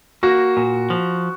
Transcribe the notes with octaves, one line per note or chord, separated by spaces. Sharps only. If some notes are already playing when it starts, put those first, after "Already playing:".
A#3 F#4
A#2
F3